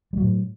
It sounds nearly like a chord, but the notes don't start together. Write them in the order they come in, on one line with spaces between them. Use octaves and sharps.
G3 F#3 A2